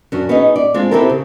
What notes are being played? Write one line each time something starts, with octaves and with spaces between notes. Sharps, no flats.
F#2 C#4 D4
B3 C#4 D#4 G#4 D#5
D5
G#3 C4 D4 F4
B3 C4 E4 G4 A4 A#4
C#3